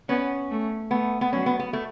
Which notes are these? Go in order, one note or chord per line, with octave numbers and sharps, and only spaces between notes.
B3 C#4
A3
A3 B3
B3
F#3 C#4
B3
B3
A3